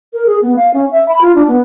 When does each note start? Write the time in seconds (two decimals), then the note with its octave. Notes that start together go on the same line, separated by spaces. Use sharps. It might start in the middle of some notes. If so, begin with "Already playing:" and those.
0.13 A#4
0.26 G#4
0.42 B3
0.56 F5
0.74 C#4
0.91 E5
1.08 B5
1.21 F4
1.35 D4
1.48 B3